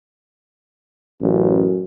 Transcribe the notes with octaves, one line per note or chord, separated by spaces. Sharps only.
A1 F#2